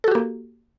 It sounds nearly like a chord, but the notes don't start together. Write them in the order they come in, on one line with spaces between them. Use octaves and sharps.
A4 F#4 G4 A#3